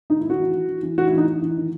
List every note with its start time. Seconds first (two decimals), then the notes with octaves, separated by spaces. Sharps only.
0.10 D#3 D#4
0.21 E4
0.25 D#3 F#4
0.40 E3
0.54 E3
0.68 E3
0.83 E3
0.97 E3 F#4
1.08 E4
1.13 E3 D#4
1.28 E3
1.42 E3
1.57 D#3